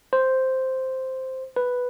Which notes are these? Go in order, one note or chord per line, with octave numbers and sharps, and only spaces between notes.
C5
B4